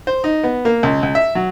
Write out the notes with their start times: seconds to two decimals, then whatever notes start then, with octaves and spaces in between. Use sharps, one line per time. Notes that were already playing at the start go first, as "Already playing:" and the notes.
0.07 C5
0.24 D#4
0.44 B3
0.65 A#3
0.83 C#2
1.03 C#2
1.15 E5
1.35 F#3